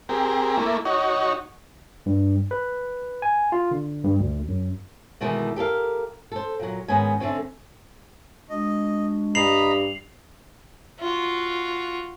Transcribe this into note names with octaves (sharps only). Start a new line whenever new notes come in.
C4 G4 G#4 A#4
A3 A#3 E4
D#4 F#4 C#5
G2
B4
G#5
F4
D3
G2
D2
F#2
B2 D#3 E3 G#3 A3
G4 A4 A#4 F5
A4 C5
A#2 F#3
G#2 D#3 B3 C#4 G#5
D3 A3 C4 C#4
G#3 D4 F#4 D#5
G2 D#5 A#5 B5 C7 F7 F#7
F4 F#4